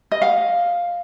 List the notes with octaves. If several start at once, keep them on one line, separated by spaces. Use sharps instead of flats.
D#5
F5